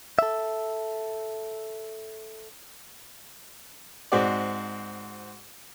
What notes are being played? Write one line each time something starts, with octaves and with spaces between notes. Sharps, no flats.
A4 E5
G#2 C4 F#4 D5